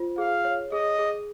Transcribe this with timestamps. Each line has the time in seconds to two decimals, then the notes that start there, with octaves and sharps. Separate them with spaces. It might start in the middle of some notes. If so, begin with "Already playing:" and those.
Already playing: F4 C5
0.18 G#4 F5
0.45 C#5
0.72 G#4 D#5
0.99 G#4